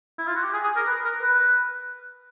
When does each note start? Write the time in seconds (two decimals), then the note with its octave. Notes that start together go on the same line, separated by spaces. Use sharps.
0.18 E4
0.27 F4
0.36 F#4
0.44 G4
0.53 G#4
0.64 G#4
0.76 A#4
0.87 B4
1.04 A#4
1.22 B4